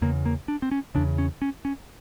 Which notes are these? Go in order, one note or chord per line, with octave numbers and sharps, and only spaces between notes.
E2 C#3 A#3
A#3
D4
C4
C#4
E2 C#3 D4
C#4
C#4
C#4